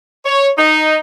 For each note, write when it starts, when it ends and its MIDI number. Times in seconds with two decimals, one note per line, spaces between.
0.25 0.49 73
0.57 0.96 63